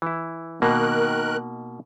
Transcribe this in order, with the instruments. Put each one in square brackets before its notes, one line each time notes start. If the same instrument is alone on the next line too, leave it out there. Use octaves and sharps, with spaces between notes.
[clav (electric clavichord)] E3 E4
[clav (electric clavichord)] B2 A#3 D#4 [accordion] D#3 A#4 F#6